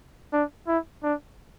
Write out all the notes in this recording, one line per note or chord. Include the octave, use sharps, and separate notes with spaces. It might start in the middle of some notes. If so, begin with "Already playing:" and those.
D4
E4
D4